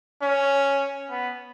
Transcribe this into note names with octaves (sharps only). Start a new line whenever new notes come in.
C#4
B3